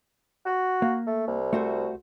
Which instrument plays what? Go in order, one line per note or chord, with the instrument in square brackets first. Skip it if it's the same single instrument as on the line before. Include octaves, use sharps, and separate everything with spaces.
[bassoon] F#4
[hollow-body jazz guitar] A#3
[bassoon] A3
C2
[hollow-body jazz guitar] A3 F#4 C5